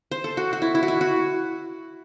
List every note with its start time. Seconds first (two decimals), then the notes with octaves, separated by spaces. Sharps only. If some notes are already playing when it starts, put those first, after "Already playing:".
0.11 C5
0.24 A4
0.37 F#4
0.53 F#4
0.62 E4
0.75 E4
0.83 F#4
0.88 E4
1.01 F#4